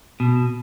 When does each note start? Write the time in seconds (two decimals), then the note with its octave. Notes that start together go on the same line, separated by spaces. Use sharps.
0.20 B2